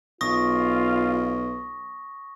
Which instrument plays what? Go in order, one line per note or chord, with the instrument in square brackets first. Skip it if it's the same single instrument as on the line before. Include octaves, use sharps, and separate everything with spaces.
[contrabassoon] B1 [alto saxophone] F4 [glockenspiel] C#6 D#6 A#6